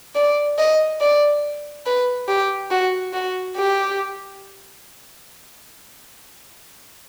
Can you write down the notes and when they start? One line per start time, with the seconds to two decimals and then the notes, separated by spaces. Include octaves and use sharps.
0.15 D5
0.58 D#5
1.01 D5
1.86 B4
2.28 G4
2.71 F#4
3.13 F#4
3.57 G4